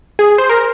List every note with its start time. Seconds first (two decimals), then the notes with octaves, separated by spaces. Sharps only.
0.19 G#4
0.38 C5
0.49 A#4